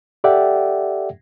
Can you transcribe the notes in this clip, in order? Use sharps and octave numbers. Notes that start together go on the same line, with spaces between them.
G4 A4 D5 E5 F#5 G5